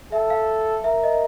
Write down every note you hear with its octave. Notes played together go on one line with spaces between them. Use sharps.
A4 E5
F5
A#4 E5
D#5